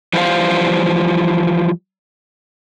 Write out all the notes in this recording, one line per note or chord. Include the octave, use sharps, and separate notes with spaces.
E3 F3 G3 C5 F5